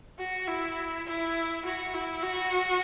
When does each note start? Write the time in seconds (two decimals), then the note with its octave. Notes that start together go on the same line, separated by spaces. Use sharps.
0.19 F#4
0.48 E4
1.07 E4
1.65 F#4
1.94 E4
2.23 F#4